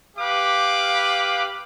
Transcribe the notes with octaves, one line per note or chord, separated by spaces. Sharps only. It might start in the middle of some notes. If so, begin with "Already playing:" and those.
G4 B4 F5 D6